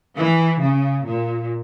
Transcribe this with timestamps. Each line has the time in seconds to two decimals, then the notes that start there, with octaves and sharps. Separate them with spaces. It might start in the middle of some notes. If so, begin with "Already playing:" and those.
0.17 E3
0.60 C#3
1.05 A#2